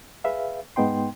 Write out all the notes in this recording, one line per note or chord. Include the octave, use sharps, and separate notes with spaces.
G#4 B4 E5 F5
G#2 G#3 B3 D#4 G5 C6